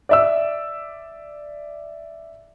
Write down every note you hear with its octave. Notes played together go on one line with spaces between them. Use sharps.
D5 E5 E6